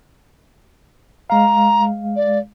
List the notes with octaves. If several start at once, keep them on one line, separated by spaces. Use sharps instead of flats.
G#3 F5 A#5
D5